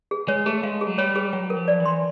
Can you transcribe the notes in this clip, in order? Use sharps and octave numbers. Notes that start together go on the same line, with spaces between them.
G#4
G#3 C#5
A3 G#4
G#3 F5
G#4
F#3
G3 C#5
G#4
F#3 G5
A#4
F3
D5
E3
C6